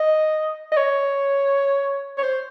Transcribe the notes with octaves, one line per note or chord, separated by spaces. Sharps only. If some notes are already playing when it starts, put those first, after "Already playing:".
Already playing: D#5
D#5
C#5
C#5
C5